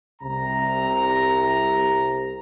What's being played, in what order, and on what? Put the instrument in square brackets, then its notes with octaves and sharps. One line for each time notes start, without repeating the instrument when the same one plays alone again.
[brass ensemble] C2 C3 A#5